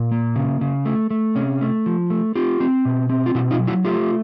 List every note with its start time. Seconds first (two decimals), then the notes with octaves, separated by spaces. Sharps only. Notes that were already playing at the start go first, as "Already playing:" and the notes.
Already playing: A#2
0.11 A#3
0.36 C#3
0.61 C#3
0.85 A3
1.11 A3
1.35 C3 C#4
1.61 A3
1.86 F3
2.10 A3
2.36 C4 F4 G4
2.60 C4
2.85 B2
3.10 C4
3.26 F4
3.35 B2 E4 F#4
3.51 D#4 F4
3.59 F#3
3.67 E4 F#4
3.85 A3 F4 G4